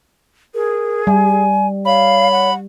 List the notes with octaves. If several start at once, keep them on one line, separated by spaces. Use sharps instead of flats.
G#4 A#4
G3 G#5
C#5 F5 B5
F#5